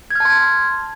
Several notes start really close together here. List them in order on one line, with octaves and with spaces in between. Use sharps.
G#6 F6 A5 C6